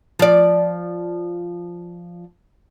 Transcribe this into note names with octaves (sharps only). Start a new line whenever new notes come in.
F3 D5